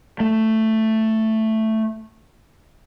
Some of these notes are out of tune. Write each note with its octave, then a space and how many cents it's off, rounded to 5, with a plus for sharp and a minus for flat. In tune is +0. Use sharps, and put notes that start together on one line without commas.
A3 +5